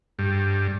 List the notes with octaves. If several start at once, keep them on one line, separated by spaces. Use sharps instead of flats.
G2